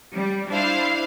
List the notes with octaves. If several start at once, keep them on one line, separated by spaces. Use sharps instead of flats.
G3
D4 E4 C5 F5